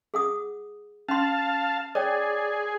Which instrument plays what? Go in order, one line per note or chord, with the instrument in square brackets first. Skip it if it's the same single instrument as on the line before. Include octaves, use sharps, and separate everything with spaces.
[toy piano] G#4 F#5 D#6
[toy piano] C#4 C6 [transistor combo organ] F5 A5
[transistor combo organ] G#4 [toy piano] C#5 G5 [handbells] D5